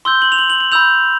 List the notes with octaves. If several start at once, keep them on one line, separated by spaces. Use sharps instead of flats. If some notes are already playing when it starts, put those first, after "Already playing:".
C6 E6 G6 G7
F#7
F7
F#7
F#7
F#7
B5 E6 G6 F7